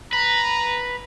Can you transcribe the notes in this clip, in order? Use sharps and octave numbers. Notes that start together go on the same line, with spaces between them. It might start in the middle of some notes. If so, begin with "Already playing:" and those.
B4 A#5